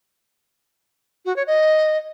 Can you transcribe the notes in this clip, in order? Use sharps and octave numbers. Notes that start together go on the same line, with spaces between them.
F#4
C#5
D#5